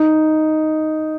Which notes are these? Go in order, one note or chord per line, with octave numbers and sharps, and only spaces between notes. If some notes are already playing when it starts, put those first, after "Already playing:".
Already playing: D#4